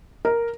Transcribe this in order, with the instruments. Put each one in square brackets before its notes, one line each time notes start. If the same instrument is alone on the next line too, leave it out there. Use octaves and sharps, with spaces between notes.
[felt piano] A#4